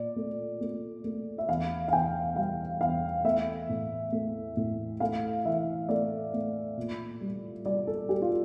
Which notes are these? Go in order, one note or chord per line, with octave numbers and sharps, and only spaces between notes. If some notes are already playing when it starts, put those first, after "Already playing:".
Already playing: A#2 D5
A3
A3
A3
E5
E2 F5
F5
E2 G5
G3 F5
E2 F5
A3 E5
A2
A3
A2
A3 F5
E3 E5
A3 D5
A3
A#2
G3
G3 D5
A4
G3 G4
F4